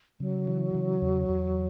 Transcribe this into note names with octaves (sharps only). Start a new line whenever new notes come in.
C#3 F#3
E3
C#3
E2
E2